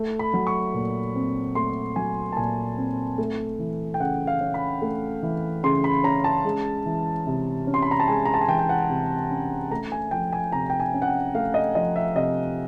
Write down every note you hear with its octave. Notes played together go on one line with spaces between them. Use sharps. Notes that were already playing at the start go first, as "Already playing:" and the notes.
Already playing: A3
B5
F#3
C#6
A#2
C4
A3 C6
F#3 G#5
A5
A#2 G#5
C4
A3
E3
G5
C#3 F#5
F5
C#4
B5
A3
E3
C#3 C6
B5
C#4 A#5
A5
G#3
E3
C3
C#4
C6
B5
A#5
A5
G#3 G#5
A#5
A5
G#5
E3 G5
G5
F#5
C3
C#4
A3 A#5
G#5
F3 G5
G#5
C3 A#5
G5
G#5
C#4
F#5
G5
A3 F5
D#5
F3 D#5
E5
C3 D#5